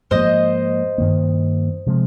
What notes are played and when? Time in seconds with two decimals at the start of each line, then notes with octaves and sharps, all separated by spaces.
0.11 G#2 F3 A#3 C5 D#5
0.98 G2 D#3 A#3
1.87 C3 F3 G#3